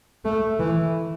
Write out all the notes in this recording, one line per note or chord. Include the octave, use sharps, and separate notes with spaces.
A3
E3